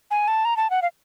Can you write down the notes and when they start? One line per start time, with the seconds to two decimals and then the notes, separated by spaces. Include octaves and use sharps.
0.11 G#5
0.28 A5
0.45 A#5
0.57 A5
0.70 F#5
0.82 F5